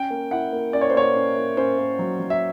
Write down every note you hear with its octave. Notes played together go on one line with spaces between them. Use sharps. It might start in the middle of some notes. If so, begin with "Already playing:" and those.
Already playing: C#4 G5
A#3
E4 F#5
A#3
C#4 D5
C#5
C5
A#3 C#5
C#4
A#3
C#4 C5
A#3
F#3
F#3
E5